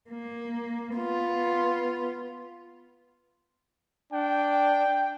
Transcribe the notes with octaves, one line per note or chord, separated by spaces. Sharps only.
A#3
B3 F4
D4 G5